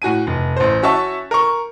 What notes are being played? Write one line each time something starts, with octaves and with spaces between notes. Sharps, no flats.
A2 F#4 G#5 D#7
F1
A1 C5
C#4 F#4 E5 A5 C#6
A#4 C#6